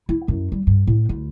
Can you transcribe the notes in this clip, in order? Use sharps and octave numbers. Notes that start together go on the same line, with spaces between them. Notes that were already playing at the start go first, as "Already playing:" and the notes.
E4
F#2
G3
G2
A2
D2